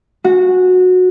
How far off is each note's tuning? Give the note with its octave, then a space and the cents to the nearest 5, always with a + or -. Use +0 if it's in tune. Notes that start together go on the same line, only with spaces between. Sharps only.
F#4 -15